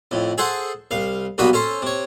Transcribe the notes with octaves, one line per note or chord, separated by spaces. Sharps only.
F2 A2
G#4 A4 C5 F#5
C2 F5
B1 G2 A#3 F#4 B5 D#6
C#4 A4 C5
C3 C#5